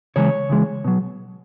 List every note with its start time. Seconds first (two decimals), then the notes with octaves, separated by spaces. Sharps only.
0.16 C#3 E3 G#3 C#5
0.49 C#3 E3 G#3
0.85 B2 F#3